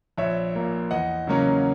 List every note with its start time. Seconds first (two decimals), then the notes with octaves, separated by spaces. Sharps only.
0.18 A#1 C#5 E5
0.55 A#2 A#3
0.91 E2 D#5 F#5
1.27 C#3 F#3 A#3 C#4